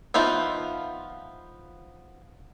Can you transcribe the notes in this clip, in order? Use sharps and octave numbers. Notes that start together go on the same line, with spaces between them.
F3 B3 D#4 F4 E5